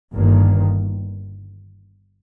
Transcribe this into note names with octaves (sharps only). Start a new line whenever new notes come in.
G1 G2 D#3 A#3